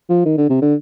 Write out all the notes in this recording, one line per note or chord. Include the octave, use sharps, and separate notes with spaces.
F3
D#3
D3
C3
D3